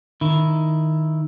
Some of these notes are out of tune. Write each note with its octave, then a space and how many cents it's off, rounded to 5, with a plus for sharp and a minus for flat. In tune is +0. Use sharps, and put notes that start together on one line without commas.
D#3 +0 E4 +0